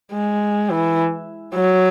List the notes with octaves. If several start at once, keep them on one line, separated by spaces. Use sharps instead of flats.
G#3
E3
F#3